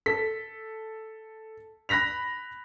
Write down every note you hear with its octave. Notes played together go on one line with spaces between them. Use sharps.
A4 B6
B5 F#6 A#6 B6 F7